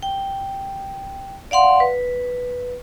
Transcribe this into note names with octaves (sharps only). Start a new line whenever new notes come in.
G5
D5 F5 F#5 C6
B4